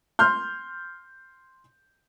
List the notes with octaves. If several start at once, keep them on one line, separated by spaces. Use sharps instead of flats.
C6 F6 G6